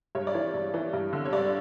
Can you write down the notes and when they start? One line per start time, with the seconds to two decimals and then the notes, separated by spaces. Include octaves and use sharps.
0.15 G2 C#5
0.27 D5
0.34 E3 C#5
0.54 G2
0.74 E3
0.93 G2
1.13 D3
1.25 C#5
1.33 G2 D5